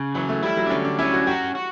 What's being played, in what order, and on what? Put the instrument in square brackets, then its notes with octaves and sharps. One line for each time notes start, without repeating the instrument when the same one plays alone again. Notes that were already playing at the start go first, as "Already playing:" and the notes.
Already playing: [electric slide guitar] C#3
[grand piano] E3 [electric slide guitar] F#3
[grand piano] A3
[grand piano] G3 [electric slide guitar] E4
[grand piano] F#3
D4
[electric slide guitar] D3 [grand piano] C#4
[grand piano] D4
[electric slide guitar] C#4 [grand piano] E4
[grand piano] F#4
[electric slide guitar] F#4 [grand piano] G4
[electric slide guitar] F#4